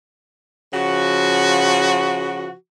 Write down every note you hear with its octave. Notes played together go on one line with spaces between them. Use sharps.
C#3 F3 F#4